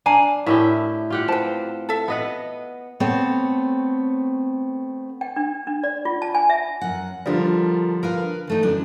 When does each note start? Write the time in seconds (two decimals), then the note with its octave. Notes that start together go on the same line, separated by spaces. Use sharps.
0.06 D4 F5 G#5 A#5
0.46 A2 E4 G4 A#4 E5
1.10 F4 G4 F#5
1.28 C4 B4 A5
1.89 A4 E5
2.08 B3 D#5 F#5
3.00 A3 B3 C4 C#5
5.21 G5
5.36 D4
5.67 D4
5.83 D5
6.05 F4
6.22 A5
6.35 G#5
6.50 E5
6.81 F#2 F#5
7.26 D3 F3 G3 F4 A#4
8.03 A#4 B4 F5
8.47 E3 A3 D#4
8.63 F#2 D3 D4